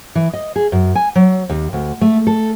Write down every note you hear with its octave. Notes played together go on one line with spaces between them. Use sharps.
E3
D#5
G#4
F#2
G#5
F#3
D#2
D2
A3
A4